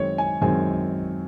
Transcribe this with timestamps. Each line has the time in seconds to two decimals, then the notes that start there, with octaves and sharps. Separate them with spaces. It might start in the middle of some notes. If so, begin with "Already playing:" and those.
Already playing: F#2 D#3 G#3 C4 C#5
0.18 G#5
0.42 F#2 D#3 G#3 C4 G#5